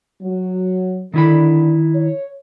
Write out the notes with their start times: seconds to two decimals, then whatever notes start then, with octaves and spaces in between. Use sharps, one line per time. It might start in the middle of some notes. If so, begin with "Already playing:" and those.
0.22 F#3
1.14 D3 D#3 E4 B5
1.95 C#5